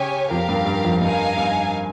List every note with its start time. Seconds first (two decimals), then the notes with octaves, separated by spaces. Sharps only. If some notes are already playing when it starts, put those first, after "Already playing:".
Already playing: C#3 G4 C#5 G#5
0.31 F2 G4 A#4 F5
0.48 G2
0.66 G2
0.85 F2
1.01 G2 D#4 A#4 F5 G#5
1.38 G2